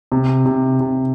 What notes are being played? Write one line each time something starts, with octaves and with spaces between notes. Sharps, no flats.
C3
C3
C3